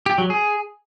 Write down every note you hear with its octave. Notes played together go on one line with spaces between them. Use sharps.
G4
F#3
G#4